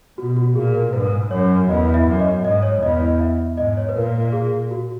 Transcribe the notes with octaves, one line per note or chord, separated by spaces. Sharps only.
B2 F#4
F#4
A#2 G#4
A#4
G#2 B4
F#2 C#5
E2 D#5
E5
F#2
D#5
G#2 D#5
C#5
E2 D#5
D#5
E5
G#2 D#5
C#5
B4
A#2 A#4
G#4
F#4